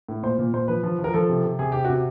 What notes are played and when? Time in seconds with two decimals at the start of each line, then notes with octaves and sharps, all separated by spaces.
0.08 A2
0.23 A#2 C5
0.39 A#2
0.53 A#2 C5
0.68 F3 B4
0.83 F3
0.99 F3
1.04 A#4
1.14 F3 A4
1.29 C3
1.43 C3
1.59 C3 G#4
1.72 C3 G4
1.84 C3 F#4